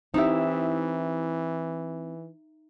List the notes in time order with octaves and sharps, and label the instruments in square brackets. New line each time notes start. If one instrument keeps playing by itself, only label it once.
[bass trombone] E3 [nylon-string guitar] C4 E4 G4 [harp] D#4 E5